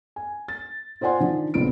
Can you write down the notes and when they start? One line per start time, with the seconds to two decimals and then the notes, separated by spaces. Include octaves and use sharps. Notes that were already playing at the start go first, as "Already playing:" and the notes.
0.16 G#5
0.48 A6
1.01 F4 C5 D5 F#5 G#5 C6
1.20 D#3 F3 D4
1.54 A#1 C#3 B3 C4 D7